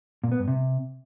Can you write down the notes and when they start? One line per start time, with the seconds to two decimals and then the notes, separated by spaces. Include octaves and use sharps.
0.24 A#2
0.32 B3
0.40 G2
0.48 C3